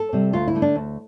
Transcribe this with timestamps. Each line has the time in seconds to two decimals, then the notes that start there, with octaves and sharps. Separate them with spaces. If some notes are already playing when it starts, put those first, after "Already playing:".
Already playing: A4
0.13 C3 G3
0.33 D2 F4
0.48 E4
0.55 D3 A3
0.62 D4
0.75 D2